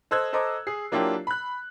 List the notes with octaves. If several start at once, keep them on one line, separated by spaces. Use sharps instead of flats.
A4 C5 D#5 E6 F#6 G#6
A4 C5 D#5 A#5 D6
G#4 C7
F#3 A#3 D4 E4 F4 G4
B5 F#6